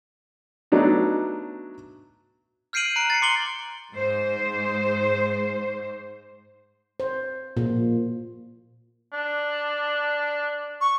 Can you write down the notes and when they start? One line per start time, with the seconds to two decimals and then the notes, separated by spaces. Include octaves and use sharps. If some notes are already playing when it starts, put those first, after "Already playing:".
0.72 F#3 A3 B3 D4 D#4
2.73 F6 G6 C7 D7 D#7 F#7
2.96 A#5 F#6 D7
3.10 A6 C7 C#7
3.22 A#5 C6 D6 C#7 F#7 G7
3.93 G#2 C5
7.00 C5
7.57 A#2
9.13 D4
10.81 C#6